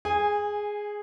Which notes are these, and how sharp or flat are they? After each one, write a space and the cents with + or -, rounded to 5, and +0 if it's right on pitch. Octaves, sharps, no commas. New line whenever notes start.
G#4 +0 G#5 -20